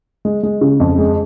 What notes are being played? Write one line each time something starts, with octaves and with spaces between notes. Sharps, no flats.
G#3
G#3
C#3
F2
G#3